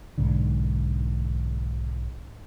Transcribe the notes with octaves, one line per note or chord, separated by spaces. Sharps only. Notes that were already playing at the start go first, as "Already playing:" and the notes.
B1 G#2 D3